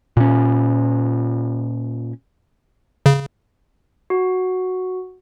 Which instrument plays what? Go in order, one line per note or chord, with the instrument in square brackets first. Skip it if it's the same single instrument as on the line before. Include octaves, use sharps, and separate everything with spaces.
[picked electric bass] A#2 C#4
[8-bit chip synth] C#3
[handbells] F#4